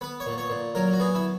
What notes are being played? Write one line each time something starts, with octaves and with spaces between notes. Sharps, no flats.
B3 B4
C#5
A#2
C#5
A#2
F#3 A#4
F#4
B3 G#4
E4